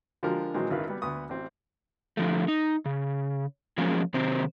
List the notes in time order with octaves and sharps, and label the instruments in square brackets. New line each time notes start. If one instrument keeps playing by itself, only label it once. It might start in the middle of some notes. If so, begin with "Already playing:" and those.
[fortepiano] D3 F3 G#3 F4 G4 A#4
A#2 D#3 E3 F#3 G#3 C4
G#1 F#2 D#3 E4 B4 F5
G3 B3
D2 B3 C#6 D#6
A1 C4
[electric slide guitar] D3 F3 A3
D#4
C#3
F3 F#3 G#3 A#3 C#4 G#4
C3 D#3 F#3 C4 C5